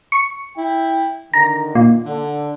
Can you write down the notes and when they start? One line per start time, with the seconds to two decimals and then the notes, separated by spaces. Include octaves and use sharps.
0.12 C#6
0.57 E4 G5
1.34 D3 D#3 A#5
1.75 A#2
2.06 D3